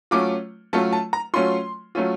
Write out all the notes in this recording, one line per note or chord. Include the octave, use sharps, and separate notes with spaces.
F#3 A3 C#4 F4 D6
F#3 A3 C#4 F4 A5
A5
A#5
F#3 A3 C#4 F4 C6
F#3 A3 C#4 F4